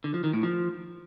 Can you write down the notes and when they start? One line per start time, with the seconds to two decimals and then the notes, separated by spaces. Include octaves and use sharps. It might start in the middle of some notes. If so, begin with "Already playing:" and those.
0.04 D3
0.14 F3
0.24 D#3
0.33 A2
0.43 F3